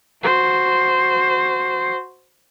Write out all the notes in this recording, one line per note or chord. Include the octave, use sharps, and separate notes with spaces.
F#4 C5